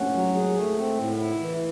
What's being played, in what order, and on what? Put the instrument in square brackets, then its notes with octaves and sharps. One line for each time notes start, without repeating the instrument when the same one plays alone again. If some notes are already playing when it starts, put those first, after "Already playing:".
Already playing: [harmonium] C#4 [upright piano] F#5
[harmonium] F#3
G#4
A3
C4
A2
E4
E3